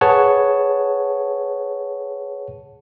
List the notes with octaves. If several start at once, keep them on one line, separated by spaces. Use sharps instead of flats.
G#4 B4 C#5 F#5 A5